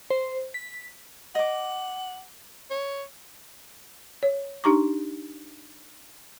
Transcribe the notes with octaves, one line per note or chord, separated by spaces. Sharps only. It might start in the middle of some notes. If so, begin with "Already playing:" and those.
C5
B6
D#5 F#5 D6
C#5
C#5
D4 D#4 G4 A#5 C#6 D6